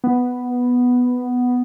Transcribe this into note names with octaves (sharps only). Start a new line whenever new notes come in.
B3